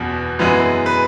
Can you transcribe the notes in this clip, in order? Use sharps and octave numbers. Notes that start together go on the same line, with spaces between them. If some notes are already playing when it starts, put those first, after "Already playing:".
Already playing: F#1 E2 B2
F#2 E3 G#3 B3
B4